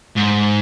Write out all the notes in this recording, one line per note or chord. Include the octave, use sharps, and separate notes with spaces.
G#2